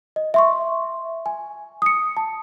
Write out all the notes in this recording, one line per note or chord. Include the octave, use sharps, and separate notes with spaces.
D#5
E5 C6 C#6
G#5
D#6 C#7
A5